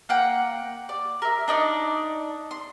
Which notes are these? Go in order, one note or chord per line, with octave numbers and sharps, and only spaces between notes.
A#3 F#5 G5
D5
A#4 E5
D4 D#4 D5
C6